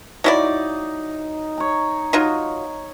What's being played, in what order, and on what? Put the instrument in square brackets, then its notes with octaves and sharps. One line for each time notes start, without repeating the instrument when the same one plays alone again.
[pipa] F#3 E4 D5 [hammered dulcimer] D#4
[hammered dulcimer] C#5 A#5
[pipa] F#3 D#4 F4